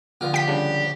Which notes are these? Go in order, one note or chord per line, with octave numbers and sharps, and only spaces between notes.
A#1 D3 F4
G4 G5 B6
C#3 G3 D4